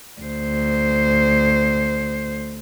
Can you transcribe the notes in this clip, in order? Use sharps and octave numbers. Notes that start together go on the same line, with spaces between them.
D2 C5